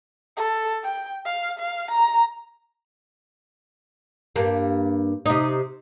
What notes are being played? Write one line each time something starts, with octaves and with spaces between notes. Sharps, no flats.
A4
G5
F5
F5
A#5
G2 A#3
C3 D#4